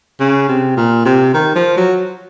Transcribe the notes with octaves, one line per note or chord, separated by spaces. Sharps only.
C#3
C3
A#2
C3
D#3
F3
F#3